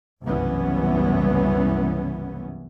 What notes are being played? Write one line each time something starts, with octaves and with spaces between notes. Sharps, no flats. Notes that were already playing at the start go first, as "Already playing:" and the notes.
F#1 C2 G2 E3 B3 C#4